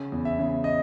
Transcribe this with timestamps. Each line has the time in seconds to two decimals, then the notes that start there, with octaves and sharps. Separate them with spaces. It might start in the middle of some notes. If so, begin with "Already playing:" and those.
Already playing: C#3
0.12 E2
0.25 E5
0.39 C#3
0.64 D#5